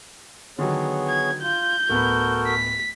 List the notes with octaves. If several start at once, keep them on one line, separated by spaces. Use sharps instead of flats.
D3 D#3 F#3 B3 G#4 C#5
G#6
F4 G6
D1 B3 F#4 A4 A#4 B5
B6